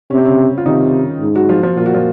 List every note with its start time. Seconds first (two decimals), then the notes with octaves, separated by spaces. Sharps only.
0.10 C3 C#4
0.18 C4
0.25 C#3 C#4
0.58 F4
0.66 C3 D#3 D#4
1.21 G#2
1.35 F#3 F#4
1.49 F3 F4
1.63 F3 F4
1.77 A#2 F4
1.86 F#4
1.94 F3 F4